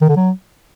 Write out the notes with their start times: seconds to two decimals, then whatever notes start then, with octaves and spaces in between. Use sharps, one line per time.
0.01 D#3
0.09 D3
0.16 F#3